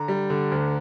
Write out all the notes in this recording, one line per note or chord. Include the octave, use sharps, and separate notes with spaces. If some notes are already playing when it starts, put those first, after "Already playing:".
Already playing: D3 A#5
G3
D3
D2